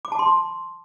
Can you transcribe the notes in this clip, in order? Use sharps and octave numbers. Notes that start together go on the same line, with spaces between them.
D6
A5
C6